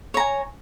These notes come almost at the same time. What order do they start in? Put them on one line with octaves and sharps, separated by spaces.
C#5 A#5 G#5